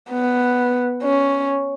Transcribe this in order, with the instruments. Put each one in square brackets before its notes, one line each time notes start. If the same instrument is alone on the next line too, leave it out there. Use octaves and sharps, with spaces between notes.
[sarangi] B3
C#4